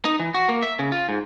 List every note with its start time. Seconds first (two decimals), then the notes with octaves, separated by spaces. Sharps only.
0.05 D#4
0.20 E3
0.34 F#4
0.49 A#3
0.62 E5
0.79 C#3
0.92 F4
1.09 G#2